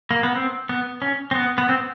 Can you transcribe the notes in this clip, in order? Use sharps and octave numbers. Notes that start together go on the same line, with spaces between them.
A#3
B3
C4
B3
C#4
C4
B3
B3
C4